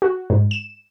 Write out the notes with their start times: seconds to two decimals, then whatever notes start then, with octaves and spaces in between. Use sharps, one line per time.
0.02 F#4
0.30 G#2
0.51 E7